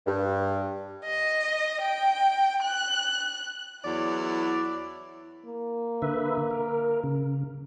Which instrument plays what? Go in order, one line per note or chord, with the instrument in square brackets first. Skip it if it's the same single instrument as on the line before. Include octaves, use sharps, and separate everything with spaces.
[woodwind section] G2
[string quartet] D#5
G5
F#6
[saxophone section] E2 F#3 D5 [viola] E4
[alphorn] A#3
[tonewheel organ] D3 B4 E5
A#4
C#3